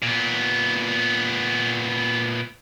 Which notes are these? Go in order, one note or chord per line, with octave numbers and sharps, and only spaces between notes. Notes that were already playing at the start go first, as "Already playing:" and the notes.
A#2 B3